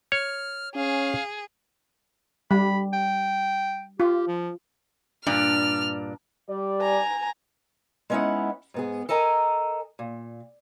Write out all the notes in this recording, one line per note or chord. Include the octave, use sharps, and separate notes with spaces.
C#5 F6
C#4 G#4 F5
G3 B5
G5
F4 G4
F3
G2 A#2 D4 F6
G3 D5
G#5 A#5
G#3 B3 C#4 D#4 E4 F#5
G#2 B3 G#4
A4 A#4 D#5 G#5 A#5
A#2